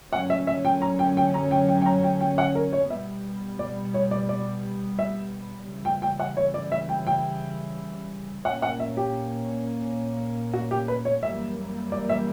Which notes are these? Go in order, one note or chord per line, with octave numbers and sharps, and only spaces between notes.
F#2 D3 F#3 C#4 F#5
E5
E5
G5
A#5
G5
G5
A#5
G5
G5
G5
A#5
G5
G5
F#5
A#4
C#5
B2 G3 B3 E5
D5
C#5
D5
D5
E5
C#3 E3 G3
G5
G5
F#5
C#5
D5
E5
G5
G5
A#2 A#3 C#4 F#5
F#5
E5
G4
F#4
G4
B4
C#5
F#2 E3 G3 A#3 E5
D5
E5